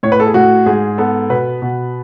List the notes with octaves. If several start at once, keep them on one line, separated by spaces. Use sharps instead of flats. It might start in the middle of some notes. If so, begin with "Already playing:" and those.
A2 C#5
B4
A4
G#4
A2 F#4
G#2 G#4
B3 A4
B2 B4
B2